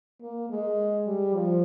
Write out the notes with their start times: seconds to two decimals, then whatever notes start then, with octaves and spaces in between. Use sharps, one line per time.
0.21 A#3
0.50 G#3
1.07 G3
1.35 F3